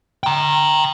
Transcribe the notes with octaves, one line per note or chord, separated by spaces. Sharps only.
G5 A#5